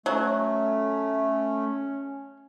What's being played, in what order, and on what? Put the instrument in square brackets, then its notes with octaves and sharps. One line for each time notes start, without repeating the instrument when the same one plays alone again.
[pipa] F#3 [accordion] A3 [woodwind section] C#4